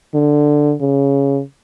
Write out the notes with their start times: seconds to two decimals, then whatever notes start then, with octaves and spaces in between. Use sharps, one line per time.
0.15 D3
0.81 C#3